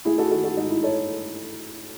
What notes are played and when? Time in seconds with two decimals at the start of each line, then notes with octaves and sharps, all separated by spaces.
0.05 A3 E4 G#4
0.18 F#4 A4
0.31 D#3 F#4 A4
0.44 F#4 A4
0.57 G#2 D#4 F#4
0.70 E4
0.83 A4 C#5